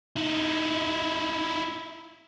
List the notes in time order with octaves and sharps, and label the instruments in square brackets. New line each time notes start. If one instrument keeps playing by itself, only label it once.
[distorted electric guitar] D#4 E4